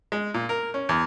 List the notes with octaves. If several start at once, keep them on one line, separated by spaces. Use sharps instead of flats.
G#3
A#2
A#4
C#4
E2